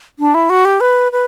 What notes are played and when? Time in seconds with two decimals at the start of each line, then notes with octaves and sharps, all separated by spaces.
0.19 D4
0.34 E4
0.50 F#4
0.65 G4
0.81 B4
1.12 B4